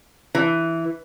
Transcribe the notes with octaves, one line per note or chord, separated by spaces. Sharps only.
E3